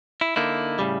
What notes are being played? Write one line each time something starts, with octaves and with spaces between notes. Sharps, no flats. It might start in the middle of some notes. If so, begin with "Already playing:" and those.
E4
D3 A#3 D#4 E4
A2 C#3 G3